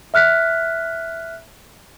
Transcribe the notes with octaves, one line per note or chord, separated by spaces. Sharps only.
E5 F6 F#6 B6